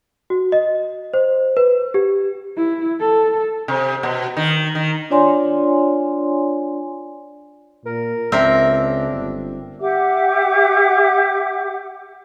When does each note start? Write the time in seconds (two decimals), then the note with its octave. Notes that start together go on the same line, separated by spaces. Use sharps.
0.30 F#4
0.52 D#5
1.14 C5
1.57 B4
1.94 G4
2.57 E4
3.00 A4
3.68 C3
4.03 B2
4.37 D#3
4.75 D#3
5.10 D4 F4 C#5 D5 G#5 C6
7.86 A#2 A#4
8.32 C#2 C4 D4 A#4 E5
9.11 G1
9.80 G4 E5 F#5 D6